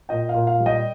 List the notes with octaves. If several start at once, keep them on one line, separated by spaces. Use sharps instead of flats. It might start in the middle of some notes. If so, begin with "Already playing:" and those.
A#2 D#5 G5
F5
A#2
F5
G3
D#5 G5